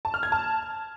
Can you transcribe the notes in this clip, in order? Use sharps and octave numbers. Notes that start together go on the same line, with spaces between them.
A5
F6
G#6
A5